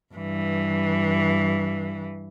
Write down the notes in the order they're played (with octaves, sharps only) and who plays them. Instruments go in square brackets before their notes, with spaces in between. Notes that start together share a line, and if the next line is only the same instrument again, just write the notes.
[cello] G2 E3